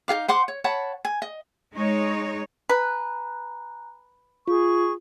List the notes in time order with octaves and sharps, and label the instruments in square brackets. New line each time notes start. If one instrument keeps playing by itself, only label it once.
[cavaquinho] D#4 A4 F5 D6
C5 F#5 C6 D6
C#5
C#5 F#5 A5 B5
G#5
D#5
[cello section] G#3 D#4 C#5
[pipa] B4 [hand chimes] G#5 A#5 F#6
[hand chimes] F4 [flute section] G#4 C#6